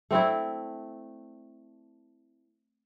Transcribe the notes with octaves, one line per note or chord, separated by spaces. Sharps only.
A3 C4 D4 E4